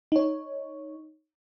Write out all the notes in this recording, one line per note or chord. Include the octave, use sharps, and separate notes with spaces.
D#4 C#5